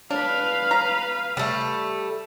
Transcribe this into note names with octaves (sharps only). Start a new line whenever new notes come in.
D4 B4 F5
A#5
G3 A3